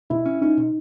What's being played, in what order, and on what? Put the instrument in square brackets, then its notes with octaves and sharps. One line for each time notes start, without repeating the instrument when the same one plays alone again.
[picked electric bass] B2 [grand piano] E4
[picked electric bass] C#4
[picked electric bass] C#4 [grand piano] D#4
[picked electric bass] B2